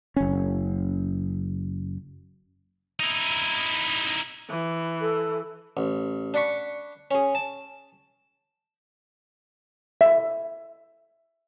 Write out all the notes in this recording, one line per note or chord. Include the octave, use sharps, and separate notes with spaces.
F#1 C#4
D#4 E4
E3
A4
A1
D4 D5 F#5 B5 C#6
C#4 G#4
A5
E5